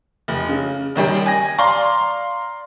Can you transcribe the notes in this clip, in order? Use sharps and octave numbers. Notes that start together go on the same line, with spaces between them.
F1
C#3
A1 D#3 G3 G5
G#5 A#6
D5 F5 A#5 C6